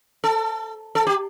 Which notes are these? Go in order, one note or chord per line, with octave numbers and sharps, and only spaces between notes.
A4
A4
G4